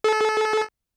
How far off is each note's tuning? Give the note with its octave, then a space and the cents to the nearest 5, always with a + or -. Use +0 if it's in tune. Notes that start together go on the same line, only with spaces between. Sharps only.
A4 -30